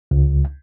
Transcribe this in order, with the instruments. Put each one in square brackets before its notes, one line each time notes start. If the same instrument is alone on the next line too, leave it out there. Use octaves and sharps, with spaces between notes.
[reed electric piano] C#2